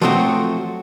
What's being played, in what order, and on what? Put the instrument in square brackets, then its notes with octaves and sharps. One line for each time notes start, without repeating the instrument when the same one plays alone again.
[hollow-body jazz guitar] F3 F#3 A3 C4 F#4